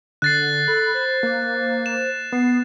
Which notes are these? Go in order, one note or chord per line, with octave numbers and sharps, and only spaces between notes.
D3 F#6 A6 C7
A4 B5
C5
A#3
E7
B3 C7